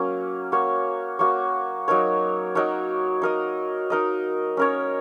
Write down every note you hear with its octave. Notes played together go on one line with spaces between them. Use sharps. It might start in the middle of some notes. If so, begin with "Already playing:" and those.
Already playing: F#3 A#3 C#4
A#3 F#4 C#5
A#3 F#4 C#5
F#3 D#4 A#4 C#5
F#3 D#4 A#4 C#5
D#4 A#4 D#5
D#4 A#4 D#5
C#4 A#4 C#5